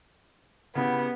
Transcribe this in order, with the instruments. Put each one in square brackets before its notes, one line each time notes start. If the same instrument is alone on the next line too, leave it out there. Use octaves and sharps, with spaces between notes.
[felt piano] C#3 E4 G4 [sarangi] B3